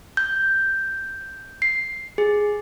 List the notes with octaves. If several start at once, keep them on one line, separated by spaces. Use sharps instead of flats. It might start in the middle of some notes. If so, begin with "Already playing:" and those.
G6
C7
G#4